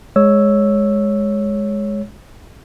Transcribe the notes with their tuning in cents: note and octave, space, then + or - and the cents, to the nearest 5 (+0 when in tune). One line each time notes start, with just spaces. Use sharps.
G#3 +0 C#5 +0 E6 +0